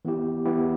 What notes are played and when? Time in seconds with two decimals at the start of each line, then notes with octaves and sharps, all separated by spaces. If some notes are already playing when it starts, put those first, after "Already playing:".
0.05 E3 B3 E4 G4
0.45 E3 B3 E4 G4